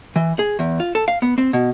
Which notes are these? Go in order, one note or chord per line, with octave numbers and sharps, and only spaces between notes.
E3
G#4
E2
F4
A4
F5
B3
C4
B2